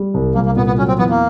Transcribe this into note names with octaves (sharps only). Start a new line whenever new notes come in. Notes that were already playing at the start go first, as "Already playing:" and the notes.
Already playing: G3
C2
C2 A#3
A#3
A#2 B3
B3
F#3 C#4
C4
E2 B3
A#3